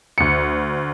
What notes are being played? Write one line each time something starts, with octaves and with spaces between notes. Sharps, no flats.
D2 C#7